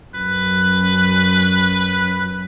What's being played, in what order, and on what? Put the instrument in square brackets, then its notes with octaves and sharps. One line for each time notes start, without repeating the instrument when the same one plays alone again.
[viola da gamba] F#2 [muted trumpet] B4